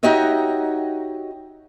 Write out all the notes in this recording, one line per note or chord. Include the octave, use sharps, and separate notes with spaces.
D#4 F#4 G4 C#5 D#5 E5